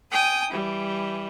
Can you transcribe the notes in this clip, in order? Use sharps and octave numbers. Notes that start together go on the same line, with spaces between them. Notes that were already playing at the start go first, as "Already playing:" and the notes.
G5 G#5 D#6
E3 G3